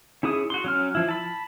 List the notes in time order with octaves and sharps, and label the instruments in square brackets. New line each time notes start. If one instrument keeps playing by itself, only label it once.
[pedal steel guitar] C#4 E4 G#4 D#6
F#4 C6
F#3 C#4 F6
F3 E4
A5 B5